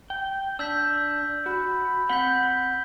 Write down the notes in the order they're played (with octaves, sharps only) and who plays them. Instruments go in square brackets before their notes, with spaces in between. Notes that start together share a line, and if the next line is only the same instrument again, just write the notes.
[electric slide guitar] G5
[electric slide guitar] D4 [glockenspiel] E6 G6 B6
[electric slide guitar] F#4 [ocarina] B5
[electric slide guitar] C4 F#5 [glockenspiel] G6 B6 G7